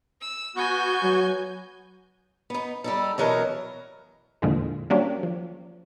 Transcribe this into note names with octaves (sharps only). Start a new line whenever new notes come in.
E6
B3 F#4 G#5 G6 G#6
F#3
B3 D#4
G3 D#4 A4
B2 E3 F#3 A#4 D#5
E2 A#2 D3 F3 G#3
F#3 G3 A#3 C#4 D4 G4
F3